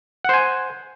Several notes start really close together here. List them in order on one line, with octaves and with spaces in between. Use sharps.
F#5 C5 G#5